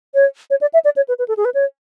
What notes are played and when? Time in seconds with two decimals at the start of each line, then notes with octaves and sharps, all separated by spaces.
0.15 C#5
0.50 C#5
0.61 D5
0.74 E5
0.85 D5
0.96 C#5
1.08 B4
1.19 B4
1.28 A4
1.37 G#4
1.45 B4
1.54 C#5